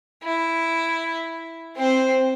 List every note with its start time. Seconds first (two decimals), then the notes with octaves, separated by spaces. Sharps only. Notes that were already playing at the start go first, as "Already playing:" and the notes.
0.23 E4
1.76 C4 C5